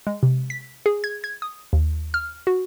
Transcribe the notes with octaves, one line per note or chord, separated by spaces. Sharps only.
G#3
C3
B6
G#4
G#6
G#6
D#6
D#2
F6
F#4